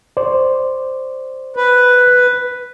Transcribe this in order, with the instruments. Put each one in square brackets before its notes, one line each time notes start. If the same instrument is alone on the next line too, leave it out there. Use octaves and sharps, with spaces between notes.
[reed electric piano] C5 D5
[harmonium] B4